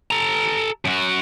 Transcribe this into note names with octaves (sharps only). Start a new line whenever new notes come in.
A4 A#5
F#2 F#4